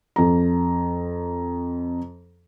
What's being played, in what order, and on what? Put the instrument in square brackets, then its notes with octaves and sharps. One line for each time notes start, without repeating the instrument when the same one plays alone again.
[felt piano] F2 A#5